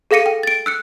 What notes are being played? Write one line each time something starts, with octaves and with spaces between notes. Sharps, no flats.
G#4 A4 F5 A#6 C#7 D#7
G5
A6 D7
E6 F#6 C#7